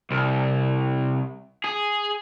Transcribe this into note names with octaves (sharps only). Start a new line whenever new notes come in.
C2
G#4